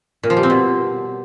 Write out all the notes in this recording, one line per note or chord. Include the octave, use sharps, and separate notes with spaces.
A#2
F3
G3
C4
B2